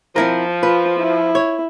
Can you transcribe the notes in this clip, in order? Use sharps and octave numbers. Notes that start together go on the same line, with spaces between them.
F3 C4 E4 A#4
F4 B4
E4
C#5